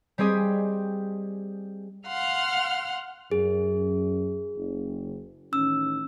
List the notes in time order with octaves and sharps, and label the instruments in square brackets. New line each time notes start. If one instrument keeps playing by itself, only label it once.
[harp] G3 C4 G4 G#4 D#5
[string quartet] F5 F#5 C6 F6
[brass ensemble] F#2 [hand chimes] G#4
[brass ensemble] F#1
[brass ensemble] A1 D#3 C#4 [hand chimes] E6